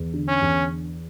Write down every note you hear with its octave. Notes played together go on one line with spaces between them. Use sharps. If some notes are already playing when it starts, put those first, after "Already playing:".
Already playing: E2
D3
C#4
E2